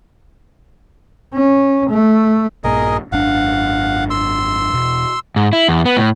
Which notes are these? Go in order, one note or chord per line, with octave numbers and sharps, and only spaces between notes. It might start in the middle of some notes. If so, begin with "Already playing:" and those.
C#4
A3
A#1 G2 A#2 G#4 A#4 D#5
G#1 F#2 D4 F5 F#5
C6 E6
E1 B2
G#2
E4
E2
B3
A2